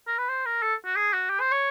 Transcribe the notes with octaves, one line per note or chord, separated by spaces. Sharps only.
A#4
B4
C5
A#4
A4
F#4
G#4
F#4
G4
C5
C#5